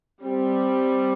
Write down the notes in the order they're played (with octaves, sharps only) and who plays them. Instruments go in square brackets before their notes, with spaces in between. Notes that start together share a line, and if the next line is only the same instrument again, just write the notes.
[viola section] G3 [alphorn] C4